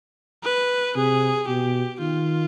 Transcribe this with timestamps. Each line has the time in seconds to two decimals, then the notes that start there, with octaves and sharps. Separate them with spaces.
0.44 B4
0.95 C3 G#4
1.48 B2 G4
2.00 D#3 F4